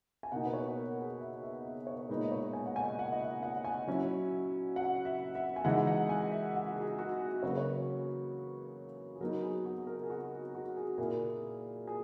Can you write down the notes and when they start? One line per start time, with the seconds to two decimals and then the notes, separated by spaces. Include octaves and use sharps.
0.23 G#5
0.32 B2 A#3 D#4 F#5
0.45 B4
0.54 C#5
0.76 A#4
0.98 G#4
1.21 E5
1.43 E5
1.65 E5
1.87 C#5
2.09 A#2 G#3 B3 D#4 B4
2.25 D#5
2.31 C#5
2.53 G#5
2.66 F#5
2.76 G#5
2.99 F#5
3.12 D#5
3.20 E5
3.43 F#5
3.64 G#5
3.87 F#3 C#4 E4
4.76 F#5
5.05 E5
5.35 E5
5.56 G#5
5.65 E3 G#3 D#4 F#5
5.87 F#5
6.09 G#5
6.32 E5
6.55 F#5
6.66 F#4
6.76 G#4
6.99 F#4
7.20 G#4
7.43 C#3 F#3 A#3 C#5
7.50 B4
7.58 C#5
9.16 G#4
9.21 F#3 B3 D#4 A#4
9.43 G#4
9.65 F#4
9.87 A#4
10.04 G#4
10.10 F#4
10.32 G#4
10.55 F#4
10.77 G#4
10.98 A#2 A#3 E4 G#4
11.87 G#4